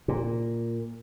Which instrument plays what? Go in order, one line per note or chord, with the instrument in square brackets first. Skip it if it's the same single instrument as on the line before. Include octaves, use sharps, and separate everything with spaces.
[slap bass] A#2